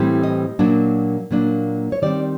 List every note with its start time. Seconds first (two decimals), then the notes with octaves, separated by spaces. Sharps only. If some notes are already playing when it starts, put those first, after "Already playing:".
Already playing: A2 E3 G3 C4
0.23 D#5
0.59 A#2 F#3 A#3 D4
1.31 A#2 F#3 A#3 D4
1.92 C#5
2.02 D#3 G3 C4 D5